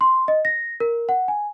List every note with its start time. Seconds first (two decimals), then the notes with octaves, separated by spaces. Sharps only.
0.01 C6
0.28 D#5
0.45 A#6
0.80 A#4
1.09 F#5
1.28 G#5